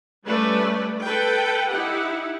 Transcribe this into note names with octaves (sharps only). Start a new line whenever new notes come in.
G3 A3 C#4 B4 D5
A4 B4 G5
D#4 E4 G4 F#5